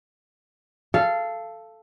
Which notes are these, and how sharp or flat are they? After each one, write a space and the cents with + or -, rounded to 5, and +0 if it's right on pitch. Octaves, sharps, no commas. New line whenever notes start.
A4 +0 F5 -20